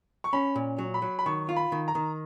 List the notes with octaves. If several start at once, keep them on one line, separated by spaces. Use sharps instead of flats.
C#6
C#4 B5
A#2
F#3
B5
F#3
B5
D#3 C#6
F4
B5
D#3
A#5
D#3